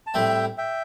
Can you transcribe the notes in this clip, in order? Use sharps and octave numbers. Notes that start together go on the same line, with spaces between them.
A5
A2 G3 C4 E5 G5
E5 G5